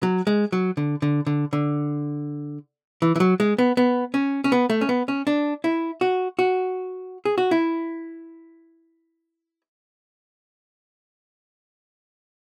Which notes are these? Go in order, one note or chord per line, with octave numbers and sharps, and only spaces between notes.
F#3
G#3
F#3
D3
D3
D3
D3
E3
E3
F#3
G#3
B3
B3
C#4
C#4
B3
A3
C#4
B3
C#4
D4
E4
F#4
F#4
G#4
F#4
E4